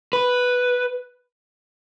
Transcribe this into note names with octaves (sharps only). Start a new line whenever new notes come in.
B4